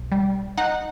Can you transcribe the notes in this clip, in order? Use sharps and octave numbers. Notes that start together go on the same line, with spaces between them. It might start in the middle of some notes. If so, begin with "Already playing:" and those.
Already playing: B1
G3
D#4 F#5